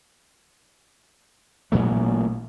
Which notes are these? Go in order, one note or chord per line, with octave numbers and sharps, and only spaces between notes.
A1 A#2 F#3 A3